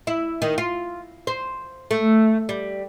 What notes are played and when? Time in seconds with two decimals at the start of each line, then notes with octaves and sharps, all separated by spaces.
0.07 E4
0.42 D#3
0.58 F4
1.27 C5
1.91 A3
2.49 G3